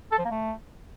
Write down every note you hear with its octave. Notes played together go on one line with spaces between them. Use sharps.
A4
F3
A#3
A3